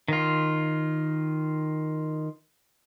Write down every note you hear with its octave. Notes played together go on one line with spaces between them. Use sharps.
D#3 F4